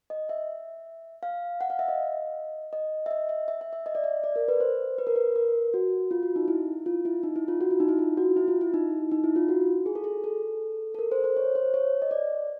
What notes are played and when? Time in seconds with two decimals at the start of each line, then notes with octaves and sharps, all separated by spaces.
0.10 D#5
0.29 E5
1.23 F5
1.61 F#5
1.70 F5
1.79 E5
1.88 D#5
2.73 D#5
3.06 E5
3.11 D#5
3.29 E5
3.48 E5
3.61 E5
3.73 E5
3.86 D#5
3.95 D5
4.04 E5
4.24 D5
4.36 A#4
4.48 B4
4.60 C5
4.98 B4
5.07 A#4
5.16 B4
5.36 A#4
5.74 F#4
6.11 F4
6.23 F#4
6.36 D#4
6.48 E4
6.86 F4
7.05 E4
7.23 D#4
7.36 E4
7.48 F4
7.61 F#4
7.71 E4
7.80 D#4
7.89 E4
7.99 F4
8.17 F#4
8.36 E4
8.48 F4
8.61 E4
8.74 D#4
9.11 D#4
9.24 E4
9.36 F4
9.49 F#4
9.86 G#4
9.95 A4
10.04 G#4
10.24 A4
10.95 A4
10.99 A#4
11.12 C5
11.24 C5
11.37 C#5
11.55 C5
11.74 C#5
12.02 D#5
12.11 D5